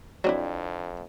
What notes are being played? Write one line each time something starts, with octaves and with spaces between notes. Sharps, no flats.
F2 F#3 C4 D4 E4